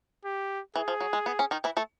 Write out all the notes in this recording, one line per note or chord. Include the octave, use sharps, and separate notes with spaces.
G4
E3 G#4
F3
F#3
G#3
B3
C#4
D#3 D#4
E3 E4
A3 A4